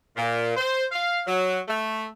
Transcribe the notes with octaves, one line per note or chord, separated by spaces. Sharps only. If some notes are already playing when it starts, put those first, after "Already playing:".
A#2
C5
F5
F#3
A3